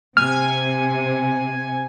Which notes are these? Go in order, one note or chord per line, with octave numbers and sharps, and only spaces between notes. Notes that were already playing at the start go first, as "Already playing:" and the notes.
C3 G#5 F6